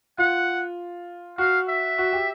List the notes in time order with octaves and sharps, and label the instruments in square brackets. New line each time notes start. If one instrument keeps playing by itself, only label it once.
[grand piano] F4 [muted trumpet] F#5
[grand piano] F#4 [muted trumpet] F5
[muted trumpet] E5
[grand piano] F#4
G4